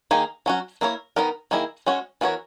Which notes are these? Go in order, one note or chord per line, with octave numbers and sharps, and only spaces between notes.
D#3 A#3 D#4 G#4
F#3 C#4 F#4
A#3 E4 A#4 C#5
D#3 G#3 B3 D#4 A#4
D#3 A#3 E4 G#4 D#5
G#3 C#4 F#4 C#5
E3 B3 F#4 A#4 C#5